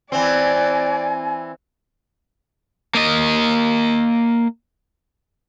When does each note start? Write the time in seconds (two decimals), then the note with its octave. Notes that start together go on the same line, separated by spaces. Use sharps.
0.12 E3 C4 D5 G#5
2.95 A#3 D#5